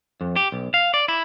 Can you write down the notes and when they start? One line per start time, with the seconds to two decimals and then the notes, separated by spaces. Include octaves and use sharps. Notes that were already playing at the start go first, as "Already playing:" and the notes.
0.21 F2
0.36 G4
0.52 B1
0.74 F5
0.94 D5
1.08 E4